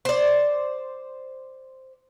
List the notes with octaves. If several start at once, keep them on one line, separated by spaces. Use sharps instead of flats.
C5 D5